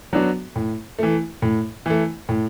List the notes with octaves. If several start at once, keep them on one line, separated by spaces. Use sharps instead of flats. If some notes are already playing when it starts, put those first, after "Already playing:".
F#3 B3 D4 F#4
A2
E3 A3
A2
E3 A3
A2